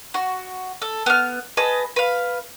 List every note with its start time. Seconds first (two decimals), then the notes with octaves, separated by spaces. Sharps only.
0.14 F#4
0.82 A4
1.06 B3 F6
1.57 G#4 B4 D#5 A5
1.96 B4 F5